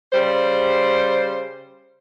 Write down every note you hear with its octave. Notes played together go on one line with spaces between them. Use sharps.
C#3 G3 C5